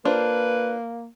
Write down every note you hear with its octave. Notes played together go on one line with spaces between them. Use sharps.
A#3 D4 F4 B4 C5